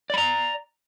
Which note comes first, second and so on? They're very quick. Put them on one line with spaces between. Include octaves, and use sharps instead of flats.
D5 B5 A#5